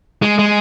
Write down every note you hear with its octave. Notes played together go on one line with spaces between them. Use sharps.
G#3
G#3